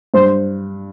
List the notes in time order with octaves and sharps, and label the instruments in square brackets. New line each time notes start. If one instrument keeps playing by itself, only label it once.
[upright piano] G2 [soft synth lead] C5